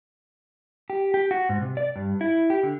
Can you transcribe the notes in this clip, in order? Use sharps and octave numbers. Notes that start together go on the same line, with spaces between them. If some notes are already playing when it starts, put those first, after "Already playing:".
G4
G4
F#4
G#2
C3
D5
G2
E4
G4
D3